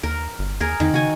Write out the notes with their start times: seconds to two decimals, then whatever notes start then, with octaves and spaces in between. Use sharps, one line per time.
0.03 D#2 A#4
0.39 G1
0.60 D#2 G#4 A#4
0.80 F2 D#3
0.94 C#3 F#4 G#5